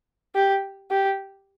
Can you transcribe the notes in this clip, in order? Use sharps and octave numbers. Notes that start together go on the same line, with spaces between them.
G4
G4